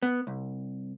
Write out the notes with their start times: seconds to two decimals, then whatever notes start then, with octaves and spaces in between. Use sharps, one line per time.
0.03 B3
0.27 C2